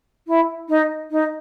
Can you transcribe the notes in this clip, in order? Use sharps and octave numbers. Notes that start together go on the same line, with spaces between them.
E4
D#4
D#4